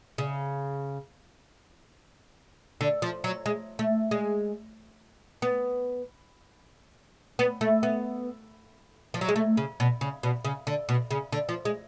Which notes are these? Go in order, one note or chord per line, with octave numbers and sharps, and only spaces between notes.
C#3
D3
F3
F#3
G#3
A3
G#3
B3
B3
A3
B3
F3
F#3
G#3
A3
C#3
B2
C#3
B2
C#3
D3
B2
C#3
D3
F3
G#3